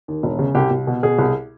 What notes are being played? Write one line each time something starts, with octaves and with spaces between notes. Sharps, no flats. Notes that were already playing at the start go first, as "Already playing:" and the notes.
D#2
E1
C#3
C2 G4
C2
B2
B2 G#4
C2